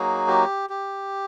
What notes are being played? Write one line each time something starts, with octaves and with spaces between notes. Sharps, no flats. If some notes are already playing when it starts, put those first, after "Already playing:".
Already playing: F#3 A#3 D#4 F#4 G#4
G4
G4